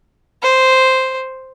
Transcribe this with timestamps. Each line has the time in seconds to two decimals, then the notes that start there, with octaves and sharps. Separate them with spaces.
0.42 C5